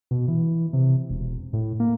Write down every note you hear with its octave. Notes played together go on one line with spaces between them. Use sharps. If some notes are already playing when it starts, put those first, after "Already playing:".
B2
E3
C3
E1
A2
A#3